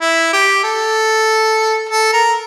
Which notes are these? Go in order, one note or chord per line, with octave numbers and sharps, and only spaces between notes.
E4
G4
A4
A4
A#4